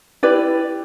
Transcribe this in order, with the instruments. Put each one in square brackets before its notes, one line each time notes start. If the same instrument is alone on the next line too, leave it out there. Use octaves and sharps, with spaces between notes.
[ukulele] E4 G4 B4 D5